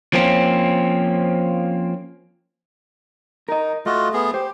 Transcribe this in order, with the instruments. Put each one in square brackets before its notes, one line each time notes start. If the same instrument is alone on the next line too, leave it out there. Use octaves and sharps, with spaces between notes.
[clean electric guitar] F3 A#3 C4 C#4
[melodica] D#4 [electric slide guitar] A#4 D#5
[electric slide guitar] A3 [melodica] F4 F#4 D#5
[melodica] B3 G#4
[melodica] G4 [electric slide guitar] C5